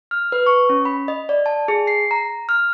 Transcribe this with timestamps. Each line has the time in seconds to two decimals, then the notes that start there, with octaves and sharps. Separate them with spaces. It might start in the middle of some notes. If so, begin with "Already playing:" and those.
0.11 F6
0.32 B4
0.46 C#6
0.69 C#4
0.85 B5
1.08 D#5
1.29 D5
1.46 A5
1.68 G#4
1.87 C7
2.11 A#5
2.49 F6